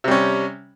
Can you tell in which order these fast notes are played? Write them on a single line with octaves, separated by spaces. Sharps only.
C3 G3 C#4